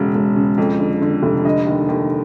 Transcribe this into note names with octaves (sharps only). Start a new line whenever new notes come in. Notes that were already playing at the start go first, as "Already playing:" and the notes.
Already playing: E1 C#3
E1
C#3
F2
D3
D3
F1
D3 D#5
D#2
D#2